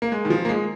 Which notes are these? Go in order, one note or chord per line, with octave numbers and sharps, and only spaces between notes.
A#3
G#3
D#3
F3
A#3
G#3